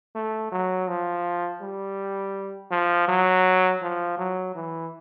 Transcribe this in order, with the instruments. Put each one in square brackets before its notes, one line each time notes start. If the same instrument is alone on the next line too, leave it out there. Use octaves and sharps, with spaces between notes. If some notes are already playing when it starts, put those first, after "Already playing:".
[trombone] A3
F#3
F3
G3
F3
F#3
F3
F#3
E3